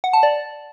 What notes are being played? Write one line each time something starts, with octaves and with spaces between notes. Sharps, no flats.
F#5
A5
D5